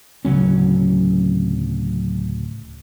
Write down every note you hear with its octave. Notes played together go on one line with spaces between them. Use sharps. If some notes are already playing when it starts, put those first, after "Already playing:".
D1 C#3 F#3 C#4